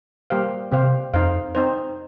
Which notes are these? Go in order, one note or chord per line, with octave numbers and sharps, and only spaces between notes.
G3 A#3 G4 C5 F5
C3 C4 G4 C5 F5
F2 D#4 C5 F5
C4 D#4 C5